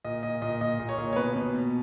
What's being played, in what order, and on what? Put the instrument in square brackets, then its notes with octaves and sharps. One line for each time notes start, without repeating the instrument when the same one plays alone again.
[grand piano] A#2 D#5
A#2 D#5
A#2 D#5
A#2 D#5
A#2
C#5
A#2
C#5
B2 B4
B2
B2